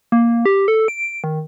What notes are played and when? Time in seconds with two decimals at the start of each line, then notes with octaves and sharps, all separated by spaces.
0.12 A#3
0.45 G4
0.68 A4
0.88 D7
1.24 D#3